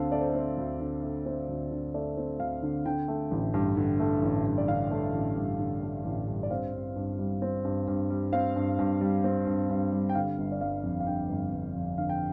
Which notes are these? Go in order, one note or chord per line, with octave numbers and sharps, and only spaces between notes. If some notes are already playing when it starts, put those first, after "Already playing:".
Already playing: D2 D3 C4 A4 F5
A3 D5
C5
A4
C4 C5
D2
D3
A3
C4
D2
D3
A3 D5
C4
D2 F5
D3
D3 G5
A3
A1
G2
D3
A3
A1
G2
D5
D3 F5
A3
A1
G2
D3
A3
A1
G2
D5
C4 F5
G2
G2
G3
C4
G2
G2
G3
C4 F5
G2
G2
G3
C4
G2
G2
G3
G5
D3 F5
G1
D5
G1 F5
F2
F5
D3 G5
G1
G1
F2
D3 F5
G5